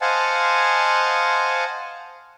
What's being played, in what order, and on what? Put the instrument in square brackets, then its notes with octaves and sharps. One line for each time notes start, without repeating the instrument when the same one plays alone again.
[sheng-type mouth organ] C5 D#5 F5 F#5 G#5 A5